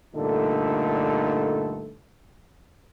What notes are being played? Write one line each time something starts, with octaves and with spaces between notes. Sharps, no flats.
G2 A#2 D3 A3 D#4 A4